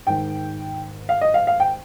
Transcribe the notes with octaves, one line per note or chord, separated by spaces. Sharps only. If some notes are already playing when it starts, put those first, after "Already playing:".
G#2 D#3 G5
F5
D#5
F5
F5
G5